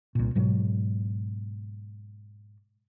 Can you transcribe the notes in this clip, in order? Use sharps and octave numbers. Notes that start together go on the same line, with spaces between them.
C2 A#2
G#2 B2 F#3 G#3